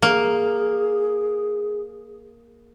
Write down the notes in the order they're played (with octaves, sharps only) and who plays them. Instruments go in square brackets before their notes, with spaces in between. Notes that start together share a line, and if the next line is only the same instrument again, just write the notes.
[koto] A#3 [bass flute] G#4